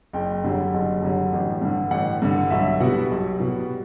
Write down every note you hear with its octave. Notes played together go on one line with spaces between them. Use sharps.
F#1 G5
F#2 D3 G3
F#1
F#2 D3 G3
A1
G2 D3
A1 F#5
G2 D3
B1 E5
B2 G3 F#5
B1
B2 G3